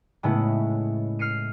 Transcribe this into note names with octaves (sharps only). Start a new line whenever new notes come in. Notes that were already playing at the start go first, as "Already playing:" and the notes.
A2 C#3 G#3 A3 B3 E4
F6 C7 C#7 D#7